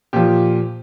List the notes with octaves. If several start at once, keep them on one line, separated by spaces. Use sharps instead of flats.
A#2 F3 G4